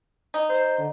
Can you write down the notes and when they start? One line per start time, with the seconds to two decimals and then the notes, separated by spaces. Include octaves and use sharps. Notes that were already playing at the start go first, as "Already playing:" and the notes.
0.34 D#4
0.49 C5
0.78 D3